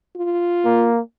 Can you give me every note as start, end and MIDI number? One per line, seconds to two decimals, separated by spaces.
0.16 0.91 65
0.65 1.00 58